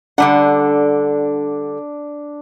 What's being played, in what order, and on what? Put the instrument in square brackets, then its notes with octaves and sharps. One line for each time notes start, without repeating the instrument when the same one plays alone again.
[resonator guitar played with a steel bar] D3 G3 F#5 [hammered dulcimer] D4